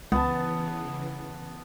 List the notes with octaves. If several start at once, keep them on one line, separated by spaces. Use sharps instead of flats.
C#2 C#3 E3 B3 A5